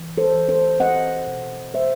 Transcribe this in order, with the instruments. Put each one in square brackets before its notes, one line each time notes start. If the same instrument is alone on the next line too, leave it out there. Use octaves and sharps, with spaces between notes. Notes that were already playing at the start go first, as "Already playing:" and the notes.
Already playing: [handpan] E3
A4 C5
E3
A4 C5
C4 D#5 F#5
B2
A3 C5 E5